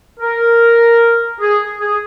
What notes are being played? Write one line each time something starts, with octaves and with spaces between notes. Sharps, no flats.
A#4
G#4
G#4